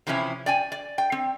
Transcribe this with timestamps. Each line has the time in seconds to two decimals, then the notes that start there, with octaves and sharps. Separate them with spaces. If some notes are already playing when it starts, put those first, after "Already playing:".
0.07 C3 E3 F3 C#4 E4
0.46 D5 G5 G#5
0.72 D5
0.98 G5
1.12 C4